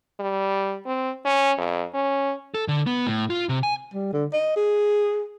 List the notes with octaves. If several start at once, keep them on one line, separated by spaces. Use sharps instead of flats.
G3
C4
C#4
F2
C#4
A4
D3
B3
A2
F4
C3
G#5
G3
D3
D#5
G#4